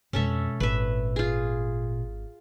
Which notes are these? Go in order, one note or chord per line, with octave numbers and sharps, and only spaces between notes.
F2 B2 G#3 C#4 A4 E5
G#1 A#2 B4 E5
F4 G#4